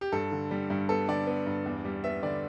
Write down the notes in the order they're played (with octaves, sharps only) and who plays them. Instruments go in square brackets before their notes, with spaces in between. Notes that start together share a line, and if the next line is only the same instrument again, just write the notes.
[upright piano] G4
G2 A4
D3
G3
G2
B3 A4
D3 D5
B3
G2
E2
G3
B3 E5
D3 D5